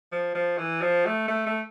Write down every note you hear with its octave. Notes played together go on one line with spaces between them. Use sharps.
F3
F3
E3
F3
A3
A3
A3